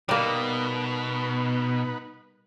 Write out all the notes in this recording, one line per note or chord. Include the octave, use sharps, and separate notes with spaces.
B2 G3 A#3 B3 D#4 B4